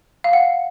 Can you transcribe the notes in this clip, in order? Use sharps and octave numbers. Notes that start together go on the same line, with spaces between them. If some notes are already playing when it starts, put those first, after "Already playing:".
F5
F#5